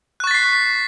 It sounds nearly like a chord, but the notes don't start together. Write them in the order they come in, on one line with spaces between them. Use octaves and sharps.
F#6 C#6 A6 B6 C7